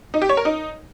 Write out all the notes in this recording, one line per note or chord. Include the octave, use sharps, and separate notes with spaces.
D#4
G4
C#5
A#4
D#4